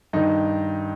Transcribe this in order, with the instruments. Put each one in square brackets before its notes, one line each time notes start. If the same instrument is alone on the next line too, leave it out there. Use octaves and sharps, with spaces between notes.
[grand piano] G2 D#3 D#4